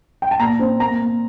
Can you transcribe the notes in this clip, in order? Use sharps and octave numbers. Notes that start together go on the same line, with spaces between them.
G5
A5
A#2 A#5
C4
A#3 A#5
A#3